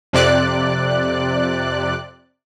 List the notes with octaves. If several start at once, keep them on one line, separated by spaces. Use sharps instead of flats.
F2 C3 D5 F#6